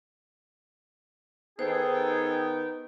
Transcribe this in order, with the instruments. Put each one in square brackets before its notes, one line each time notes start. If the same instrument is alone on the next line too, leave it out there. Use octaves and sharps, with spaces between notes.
[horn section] D#3 B3 G5 [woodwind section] D#4 G#4 A4 [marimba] C5